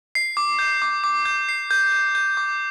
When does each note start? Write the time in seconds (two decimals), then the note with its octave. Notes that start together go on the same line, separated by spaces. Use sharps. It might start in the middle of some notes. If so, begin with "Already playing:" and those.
0.15 C7
0.37 D6
0.59 G6
0.82 D6
1.04 D6
1.25 G6
1.49 C7
1.71 G6
1.92 G6
2.15 G6
2.37 D6